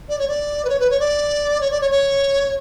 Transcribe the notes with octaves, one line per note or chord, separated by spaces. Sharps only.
D5
C#5
D5
B4
C#5
B4
C#5
D5
C#5
D5
C#5
C#5